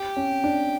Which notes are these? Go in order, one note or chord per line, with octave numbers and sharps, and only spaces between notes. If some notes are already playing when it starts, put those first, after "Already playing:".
Already playing: G4
C#4
D4